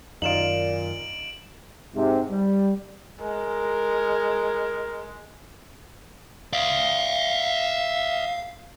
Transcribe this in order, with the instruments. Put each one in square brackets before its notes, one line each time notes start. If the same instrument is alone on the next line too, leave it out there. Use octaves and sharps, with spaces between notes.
[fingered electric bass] F#2 D#3 [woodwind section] A#2 [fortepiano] D#4 F4 [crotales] D7 E7 F#7
[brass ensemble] G#2 C3
G3
[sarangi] G#3 [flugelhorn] A#4
[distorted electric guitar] D5 E5 [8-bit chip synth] F5